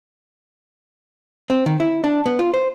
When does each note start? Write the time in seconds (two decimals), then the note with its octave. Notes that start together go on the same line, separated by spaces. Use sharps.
1.50 C4
1.66 D#3
1.80 E4
2.04 D4
2.26 B3
2.39 F4
2.54 C5